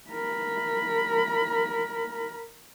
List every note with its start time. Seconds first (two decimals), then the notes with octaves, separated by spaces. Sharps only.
0.10 A#4 B5